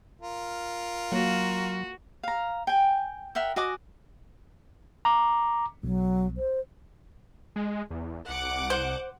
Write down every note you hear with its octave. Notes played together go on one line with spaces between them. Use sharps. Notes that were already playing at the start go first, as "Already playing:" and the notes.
F4 A#4
F#3 A#3 F#4
F5 A#5
G5 G#5
A#4 E5 F#5 G5
F#4 D#5 G#5 D6
A#5 D6
B1 F#3
C5
G#3
E2
C2 F#5 D6
C5